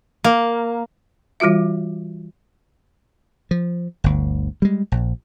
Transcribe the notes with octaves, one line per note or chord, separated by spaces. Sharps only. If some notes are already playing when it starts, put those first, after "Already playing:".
A#3
E3 G3 F4 F#4 E5
F3
G1 D2
G3 G#3
A#1